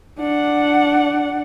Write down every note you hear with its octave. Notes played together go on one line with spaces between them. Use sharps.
D4 F#5